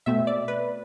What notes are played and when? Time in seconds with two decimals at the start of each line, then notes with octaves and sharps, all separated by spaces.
0.06 B2 A3 C4 E5
0.27 D5
0.48 B4